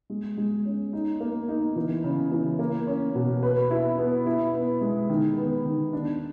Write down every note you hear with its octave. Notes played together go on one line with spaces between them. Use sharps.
G#3
G#3
C#4
D#4
A#3
D#4
E3
C#3
E3
A#3
C#4
B2
B4
E4
B3
E4
B3
G#3
D#3
B3
D#3
D4